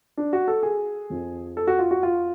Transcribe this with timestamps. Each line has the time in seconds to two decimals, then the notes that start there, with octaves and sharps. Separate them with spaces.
0.17 D4
0.33 F#4
0.48 A4
0.63 G#4
1.10 F2 F3
1.57 A4
1.67 F#4
1.79 F4
1.91 F#4
2.03 F4